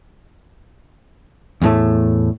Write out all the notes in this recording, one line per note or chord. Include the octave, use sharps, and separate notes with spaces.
E2 A2 A3